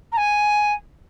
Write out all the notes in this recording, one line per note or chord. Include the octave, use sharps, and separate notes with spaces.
A#5
G#5